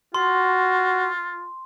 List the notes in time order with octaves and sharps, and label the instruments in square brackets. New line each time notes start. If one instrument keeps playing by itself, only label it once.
[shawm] F4 [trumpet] F#4 [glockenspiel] C6